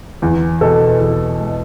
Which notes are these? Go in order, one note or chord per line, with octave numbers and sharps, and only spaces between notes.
E2
B2 A4
E2
G#3